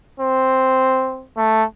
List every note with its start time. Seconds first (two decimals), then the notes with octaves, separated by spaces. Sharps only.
0.20 C4
1.37 A3